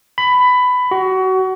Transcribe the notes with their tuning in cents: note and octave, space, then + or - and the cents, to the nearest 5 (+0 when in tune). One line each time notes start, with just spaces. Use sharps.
B5 +15
F#4 +25